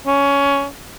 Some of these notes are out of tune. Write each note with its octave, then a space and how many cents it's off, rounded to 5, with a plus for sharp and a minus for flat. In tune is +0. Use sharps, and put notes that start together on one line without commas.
C#4 +15